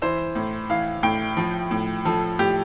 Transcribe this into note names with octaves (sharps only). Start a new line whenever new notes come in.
E3 C5
A2
E3 F5
A2 G5
F3
A2
F3 A4
A2 G4